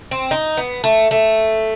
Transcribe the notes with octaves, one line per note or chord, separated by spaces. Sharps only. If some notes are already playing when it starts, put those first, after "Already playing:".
C4
D#4
B3
A3
A3